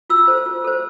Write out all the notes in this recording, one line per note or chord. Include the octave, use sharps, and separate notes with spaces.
F4 E6
A4 C5
F4
A4 C5